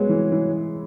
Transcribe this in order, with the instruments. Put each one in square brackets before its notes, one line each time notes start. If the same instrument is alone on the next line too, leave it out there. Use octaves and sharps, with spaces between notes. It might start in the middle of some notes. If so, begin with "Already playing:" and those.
Already playing: [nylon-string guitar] F#3 [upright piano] G#3 B3
[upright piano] E3
E3